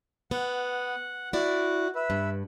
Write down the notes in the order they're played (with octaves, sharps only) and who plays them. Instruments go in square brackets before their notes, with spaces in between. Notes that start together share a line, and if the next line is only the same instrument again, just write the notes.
[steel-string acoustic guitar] B3 [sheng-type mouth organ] F#5
[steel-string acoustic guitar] E4 D5 [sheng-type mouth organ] F#4
[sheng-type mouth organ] B4 E5
[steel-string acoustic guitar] G2